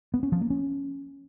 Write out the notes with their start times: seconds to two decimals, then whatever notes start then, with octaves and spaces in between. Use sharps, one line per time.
0.14 B3
0.23 C#4
0.32 F3
0.41 A#3
0.50 C#4